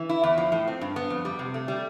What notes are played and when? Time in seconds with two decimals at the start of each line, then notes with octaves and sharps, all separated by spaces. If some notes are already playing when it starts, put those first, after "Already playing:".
Already playing: E3
0.09 E4
0.24 E2
0.38 F3
0.52 A2
0.68 C4
0.81 G2
0.96 B3
1.10 F2
1.25 G3
1.39 C3
1.54 A3
1.68 G3